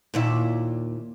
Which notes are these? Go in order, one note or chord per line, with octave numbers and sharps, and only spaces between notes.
D#2 A#2 E4